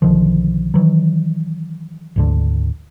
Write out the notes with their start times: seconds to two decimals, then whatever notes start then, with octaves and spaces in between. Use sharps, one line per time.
0.02 B1 D3 D#3 F3
0.74 D#3 E3 F#3
2.16 G#1 D2 D3